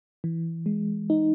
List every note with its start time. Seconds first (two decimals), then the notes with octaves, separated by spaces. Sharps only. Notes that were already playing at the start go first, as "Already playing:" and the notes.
0.24 E3
0.66 G#3
1.10 D#4